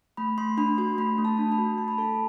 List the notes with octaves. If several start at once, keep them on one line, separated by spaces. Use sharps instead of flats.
A3 B5
A3 C6
D4 B5
F#4 C6
A3 B5
A3
A5
D4
B5
F#4
A3 A5
B5
A4 A5